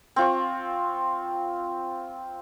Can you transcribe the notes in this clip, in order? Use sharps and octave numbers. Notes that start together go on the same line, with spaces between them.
C4 F4 C#6